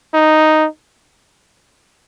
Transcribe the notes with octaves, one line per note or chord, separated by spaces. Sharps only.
D#4